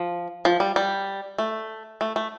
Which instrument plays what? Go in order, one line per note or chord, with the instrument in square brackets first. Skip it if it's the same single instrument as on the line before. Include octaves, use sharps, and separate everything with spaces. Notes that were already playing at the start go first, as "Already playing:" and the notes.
Already playing: [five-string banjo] F3
F3
G3
G3
A3
A3
A3